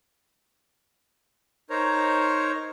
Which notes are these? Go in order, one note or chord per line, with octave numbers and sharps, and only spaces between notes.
D#4 A#4 C5 C#5 A#5